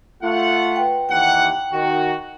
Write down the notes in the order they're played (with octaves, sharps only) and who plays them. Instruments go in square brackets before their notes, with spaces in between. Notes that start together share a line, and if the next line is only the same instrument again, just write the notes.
[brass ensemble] A3 F4 F#5
[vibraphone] B4 G5
[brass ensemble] D#2 E3 F#5 [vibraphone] G5
[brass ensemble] D#3 F#4